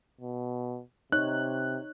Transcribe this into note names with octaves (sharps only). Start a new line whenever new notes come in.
B2
C3 D#4 C#5 F#6